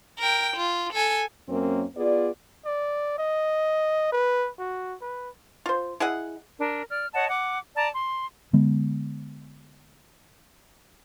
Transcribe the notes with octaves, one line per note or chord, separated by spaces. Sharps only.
A#4 G5
F4
A4 G#5
F#2 A#3 C4 C#4
B3 F4 G#4 D5
D5
D#5
B4
F#4
B4
F4 C5
E4 G#4 D#5 F#5
D4 A#4
D5 F6
C#5 D#5 F#5 A5
F#5 D6
D5 A5 A#5
C6
D3 G#3 B3